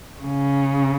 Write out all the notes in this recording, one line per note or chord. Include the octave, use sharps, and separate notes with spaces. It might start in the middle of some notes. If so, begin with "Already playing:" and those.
C#3